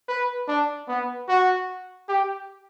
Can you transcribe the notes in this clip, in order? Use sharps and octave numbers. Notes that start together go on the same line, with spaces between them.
B4
D4
B3
F#4
G4